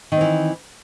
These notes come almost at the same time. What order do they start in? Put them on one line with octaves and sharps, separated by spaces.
D#3 C4 E3